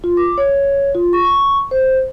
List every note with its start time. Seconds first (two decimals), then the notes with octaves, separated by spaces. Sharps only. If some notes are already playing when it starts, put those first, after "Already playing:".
0.04 F4
0.17 D6
0.38 C#5
0.95 F4
1.13 C#6
1.25 C#6
1.71 C5